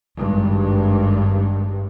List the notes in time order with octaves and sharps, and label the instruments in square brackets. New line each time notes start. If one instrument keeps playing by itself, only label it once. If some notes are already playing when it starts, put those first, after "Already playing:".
[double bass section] G#1 G2